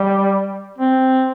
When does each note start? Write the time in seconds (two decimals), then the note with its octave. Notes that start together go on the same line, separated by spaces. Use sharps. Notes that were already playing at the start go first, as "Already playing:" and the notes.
Already playing: G3
0.78 C4